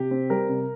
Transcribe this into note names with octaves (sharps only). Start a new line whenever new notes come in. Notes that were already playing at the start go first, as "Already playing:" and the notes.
Already playing: C3 G4
C4
G3 A#4
C3